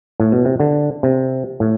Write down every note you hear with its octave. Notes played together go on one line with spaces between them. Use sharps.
A2
B2
C3
D3
C3
A2